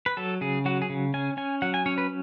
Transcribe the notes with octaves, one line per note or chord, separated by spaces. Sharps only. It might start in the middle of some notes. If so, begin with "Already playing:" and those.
B4
F#3 A4
C#3 G#4
F#3 F#4
G#4
C#3
C#4 G#5
C#4 G#5
F#3 F#5
G#5
C#4 C#5
B4